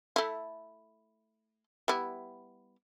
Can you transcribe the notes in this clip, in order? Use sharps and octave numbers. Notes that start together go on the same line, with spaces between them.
A3 E4
G3 B3 E4